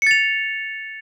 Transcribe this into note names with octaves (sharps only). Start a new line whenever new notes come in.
A6 C#7 F7